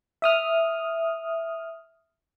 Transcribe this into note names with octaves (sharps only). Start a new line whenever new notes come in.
E5 D#6 F6